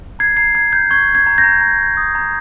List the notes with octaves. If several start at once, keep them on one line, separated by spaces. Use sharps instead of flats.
A#5 G#6 C7
A#5 G#6 C7
A#5 G#6
G6
C#6 G#6
G6
G#6
A#5
G6 A#6
A#5
A#5
A#5
D#6
A#5